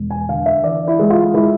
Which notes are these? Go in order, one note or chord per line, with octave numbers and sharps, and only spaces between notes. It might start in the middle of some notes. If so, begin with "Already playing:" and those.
Already playing: E1
G#5
D3 F5
E5
E3 D5
E4
G#3
F4
G#3 E4